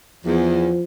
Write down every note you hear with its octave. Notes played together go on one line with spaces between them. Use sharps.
E2 F3